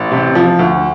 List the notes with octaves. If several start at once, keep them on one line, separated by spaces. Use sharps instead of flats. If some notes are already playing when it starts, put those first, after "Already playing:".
Already playing: A1
C3
F3
D2